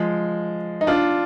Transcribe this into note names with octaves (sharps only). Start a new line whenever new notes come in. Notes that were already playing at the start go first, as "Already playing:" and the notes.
Already playing: F3 G#3
D#4
D4 F4